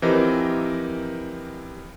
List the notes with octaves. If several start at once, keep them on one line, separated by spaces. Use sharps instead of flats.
E3 F3 C4 G4 A#4 D#5